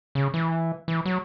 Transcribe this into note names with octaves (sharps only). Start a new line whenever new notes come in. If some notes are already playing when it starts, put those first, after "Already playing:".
C#3
E3
E3
F#3